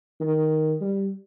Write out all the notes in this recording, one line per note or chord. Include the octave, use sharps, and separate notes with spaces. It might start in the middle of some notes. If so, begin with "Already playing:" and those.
D#3
G3